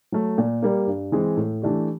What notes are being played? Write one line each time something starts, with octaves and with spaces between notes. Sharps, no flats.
F#3 A3
A#2
G3 A#3
G2
E3 G#3 C4
A2
E3 A3 D4 G4